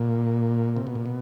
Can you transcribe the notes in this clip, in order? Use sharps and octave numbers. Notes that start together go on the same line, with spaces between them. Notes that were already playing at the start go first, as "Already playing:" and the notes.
Already playing: A#2
C3
B2
A#2
B2